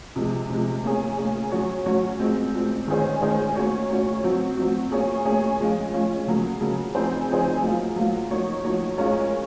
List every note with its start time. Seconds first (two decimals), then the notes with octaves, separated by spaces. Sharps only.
0.16 C3 F3 G#3
0.50 C3 F3 G#3
0.84 A#3 C#4 G#4
1.18 A#3 C#4 G#4
1.51 F#3 C#4 F#4 C#5
1.86 F#3 C#4 F#4 C#5
2.19 A#2 G#3 C4
2.54 A#2 G#3 C4
2.87 D#3 G#3 C#4 G#4 C5
3.22 D#3 G#3 C#4 G#4 C5
3.56 A#3 C#4 F#4 C#5
3.89 A#3 C#4 F#4 C#5
4.24 F#3 C4 F#4
4.57 F#3 C4 F#4
4.91 A#3 C#4 G#4 C#5
5.25 A#3 C#4 G#4 C#5
5.60 F3 G#3 C#4 F4
5.93 F3 G#3 C#4 F4
6.27 C#3 F#3 A#3
6.61 C#3 F#3 A#3
6.95 F3 C4 D#4 G#4 C5
7.28 F3 C4 D#4 G#4 C5
7.62 F#3 A#3 F4
7.96 F#3 A#3 F4
8.30 F3 A#3 D#4 F#4 C#5
8.64 F3 A#3 D#4 F#4 C#5
8.98 G#3 C#4 F4 A#4 C#5